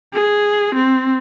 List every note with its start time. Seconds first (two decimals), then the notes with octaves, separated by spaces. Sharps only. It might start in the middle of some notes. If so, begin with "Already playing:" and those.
0.14 G#4
0.75 C4